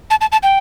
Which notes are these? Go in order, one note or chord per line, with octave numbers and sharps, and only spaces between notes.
A5
A5
A5
G5